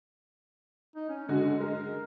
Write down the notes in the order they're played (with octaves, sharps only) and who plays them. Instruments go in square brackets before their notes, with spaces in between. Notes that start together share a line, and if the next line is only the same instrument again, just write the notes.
[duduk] D#4
C#4
[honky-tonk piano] D3 F#4 [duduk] G#3
[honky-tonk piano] G#3 [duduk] A#4